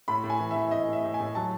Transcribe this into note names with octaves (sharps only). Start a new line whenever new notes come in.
A2 B5
A2
G#5
E3
E3 E5
E5
A2 D#5
A2 E5
A2
G#5
A2
F#3 A5